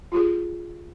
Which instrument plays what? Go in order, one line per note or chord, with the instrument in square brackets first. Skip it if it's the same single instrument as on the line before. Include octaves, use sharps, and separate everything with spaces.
[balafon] F4 G4 G#4